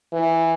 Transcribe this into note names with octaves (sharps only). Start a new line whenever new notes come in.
E3